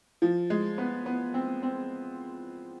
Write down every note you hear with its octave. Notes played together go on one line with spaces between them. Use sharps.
F3
G#3
B3
B3
C4
C4